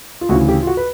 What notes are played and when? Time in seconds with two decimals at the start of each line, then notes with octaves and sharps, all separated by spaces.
0.21 F4
0.29 D2 C#3 E3 F#4
0.48 G4
0.63 F4
0.67 F#4
0.77 B4